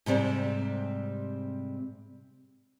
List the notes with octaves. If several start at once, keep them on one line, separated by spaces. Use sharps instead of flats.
G#2 C3 G3 C4